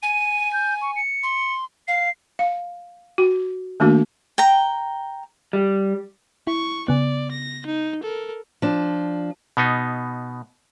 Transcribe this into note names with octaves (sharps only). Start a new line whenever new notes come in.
G#5 D#7
G6
C#6
C#7
C6
F5 C7
F5
F#4
D#3 A3 A#3 D4 F#4
G5 A#5
G3
E4 C#6
C#3 B3 D5
A#6
D#4
A4 A#4
F3 D4
B2 B3 D#4